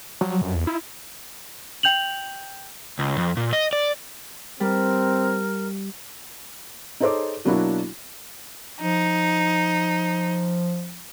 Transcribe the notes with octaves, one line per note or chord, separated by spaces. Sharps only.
F#3
F#2
E2
E4
G5 G6 F7 F#7
C#2
F2
A#2
D#5
D5
G3 C4 A#4
D#4 G#4 A4 C5 C#5 D6
B2 F#3 A#3 D4 E4 F#4
F3 D#4